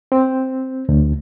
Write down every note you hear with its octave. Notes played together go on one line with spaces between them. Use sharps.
C4
D2